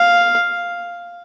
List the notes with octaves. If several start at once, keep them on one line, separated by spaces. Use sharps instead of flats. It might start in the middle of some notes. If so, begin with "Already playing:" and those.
Already playing: F5